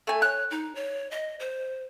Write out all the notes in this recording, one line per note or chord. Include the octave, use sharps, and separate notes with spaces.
A3 G#5
C#5 F#6
D#4
C#5
D#5
C5